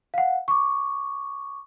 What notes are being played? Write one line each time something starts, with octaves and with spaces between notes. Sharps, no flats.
F5 F#5
C#6 D6